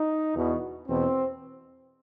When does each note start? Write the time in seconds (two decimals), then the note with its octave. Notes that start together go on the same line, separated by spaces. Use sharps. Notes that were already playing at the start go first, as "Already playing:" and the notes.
Already playing: D#4
0.35 E2 B2
0.86 E2 B2 C4